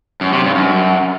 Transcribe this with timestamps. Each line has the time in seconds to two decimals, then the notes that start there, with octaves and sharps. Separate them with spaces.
0.21 F#2
0.32 C3
0.44 G2
0.55 F#2